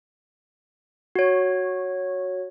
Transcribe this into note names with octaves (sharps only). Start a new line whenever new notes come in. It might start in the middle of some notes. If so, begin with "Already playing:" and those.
F#4 C#5